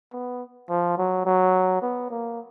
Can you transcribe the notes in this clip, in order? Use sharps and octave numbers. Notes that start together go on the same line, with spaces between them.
B3
F3
F#3
F#3
B3
A#3